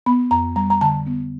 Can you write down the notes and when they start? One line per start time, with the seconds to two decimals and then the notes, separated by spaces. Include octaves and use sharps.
0.06 B3 B5
0.31 F2 A#5
0.56 G3 A#5
0.70 A#5
0.81 D3 A5
1.07 B3